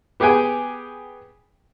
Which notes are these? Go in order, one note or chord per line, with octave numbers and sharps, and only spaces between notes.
B3 G4 G#4 G5 G#5